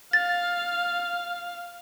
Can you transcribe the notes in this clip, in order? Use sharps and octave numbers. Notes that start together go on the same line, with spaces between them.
F5 A6